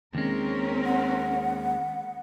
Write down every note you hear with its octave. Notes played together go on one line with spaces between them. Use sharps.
D#2 G#3 C4 C#4 A#4
F#5